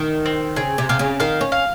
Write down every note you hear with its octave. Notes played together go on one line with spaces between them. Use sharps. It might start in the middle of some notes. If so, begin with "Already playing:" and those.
Already playing: D#3
C4
C#3 G#4
C3
C3 F5
C#3
D#3 F5
C#4
F5